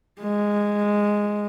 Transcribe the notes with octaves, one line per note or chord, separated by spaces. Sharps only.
G#3